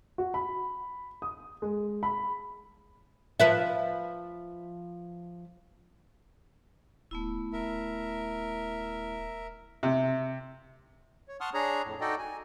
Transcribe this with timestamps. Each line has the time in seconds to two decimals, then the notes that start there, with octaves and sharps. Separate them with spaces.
0.18 F#4
0.34 B5
1.22 D#6
1.62 G#3
2.03 B5
3.40 F3 B4 E5
7.11 D1 A3 B3 E4
7.53 D#1 A#4 E5
9.83 C3
11.28 C#5
11.41 F#5 A5 C6 C#6 D#6 F6
11.54 D4 G#4 C#5 A#5
11.84 F2 A2
12.01 D#4 F#4 A4 D5 D#5 G5
12.18 G#5